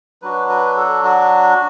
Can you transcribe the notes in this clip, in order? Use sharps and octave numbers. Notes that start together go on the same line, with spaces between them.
F#3 D4 F#4 B4
B4
A4
F#4